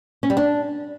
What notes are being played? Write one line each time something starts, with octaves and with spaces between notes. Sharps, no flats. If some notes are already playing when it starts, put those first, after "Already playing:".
C#4
G3
D4